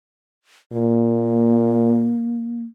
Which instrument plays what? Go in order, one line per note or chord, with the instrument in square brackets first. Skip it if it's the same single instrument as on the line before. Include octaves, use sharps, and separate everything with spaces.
[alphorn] A#2 [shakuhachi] A#3